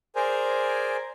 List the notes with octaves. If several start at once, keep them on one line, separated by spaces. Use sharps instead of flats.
G#4 A#4 C5 D5 G#5 A#5